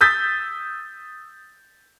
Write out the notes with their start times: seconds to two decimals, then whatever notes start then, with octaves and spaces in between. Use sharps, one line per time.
0.01 D#6 E6 G6 A6 B6